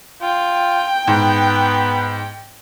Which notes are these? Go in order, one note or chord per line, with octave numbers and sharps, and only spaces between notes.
F4 G5
G#2 B3